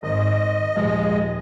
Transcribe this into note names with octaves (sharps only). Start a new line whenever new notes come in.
G#1 D#5
D#1 F3 G#3